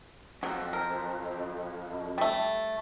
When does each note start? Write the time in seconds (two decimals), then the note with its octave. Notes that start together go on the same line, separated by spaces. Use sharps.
0.43 F2 F#3
0.73 A#4
2.18 G3 A3